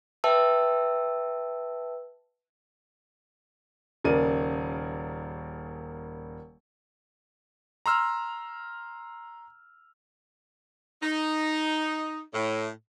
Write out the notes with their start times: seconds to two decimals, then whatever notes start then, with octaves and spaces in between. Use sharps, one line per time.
0.24 B4 E5 G5 A5 E6
4.04 D#1 C#3 A#3 A#4 D5 D#7
7.86 A#5 C6 E6 F6
11.03 D#4
12.33 A2